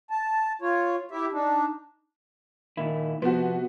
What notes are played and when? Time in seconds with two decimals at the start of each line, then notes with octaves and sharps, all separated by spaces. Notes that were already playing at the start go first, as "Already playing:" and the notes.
0.10 A5
0.62 F4 C#5
1.11 E4 G4 E5
1.32 D4 D#4
2.77 A#2 D#3 E4
3.22 C3 F3 B3 F#4